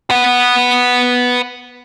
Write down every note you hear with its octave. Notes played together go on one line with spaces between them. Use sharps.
B4 F#5